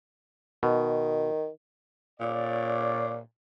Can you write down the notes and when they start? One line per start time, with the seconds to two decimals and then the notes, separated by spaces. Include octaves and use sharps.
0.63 B2 D#3
2.20 A#2 C#5 D5